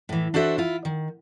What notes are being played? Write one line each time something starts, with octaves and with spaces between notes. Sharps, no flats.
A2 E3
D4 F#4 A4 C5 E5
E4 F4
D#3